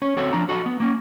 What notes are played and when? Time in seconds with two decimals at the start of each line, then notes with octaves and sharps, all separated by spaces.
0.02 C#4 C#5
0.17 C4 F#4 A4 C#5
0.33 F3 D4 A#5
0.49 F#4 A4 D#5
0.66 B3
0.80 A#3 C#4